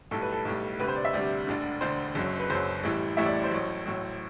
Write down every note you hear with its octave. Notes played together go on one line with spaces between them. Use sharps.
B1 A2 G3 A4
B4
A4
B1 A2 G3
D2 C3 G3 B4
C5
D5
E5
D2 C3 G3 D5
E1 D2 D3
E1 D2 D3 C5
F#1 F#2 F#3
B4
F#1 F#2 F#3 C5
A1 A2 E3 G3
A1 A2 E3 G3 E5
D5
C5
A1 A2 F#3
A1 A2 F#3